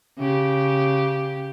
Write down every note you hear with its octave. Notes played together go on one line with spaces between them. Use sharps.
C#3 G4